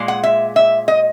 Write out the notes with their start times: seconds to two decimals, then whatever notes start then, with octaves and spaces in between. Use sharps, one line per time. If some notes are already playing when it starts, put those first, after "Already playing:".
Already playing: A#2 G#3
0.08 F#5
0.23 E5
0.56 E5
0.88 D#5